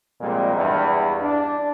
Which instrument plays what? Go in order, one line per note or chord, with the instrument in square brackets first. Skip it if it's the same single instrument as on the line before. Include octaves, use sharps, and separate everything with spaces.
[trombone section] F2 A#2 G3 G#3
E2 G2
D4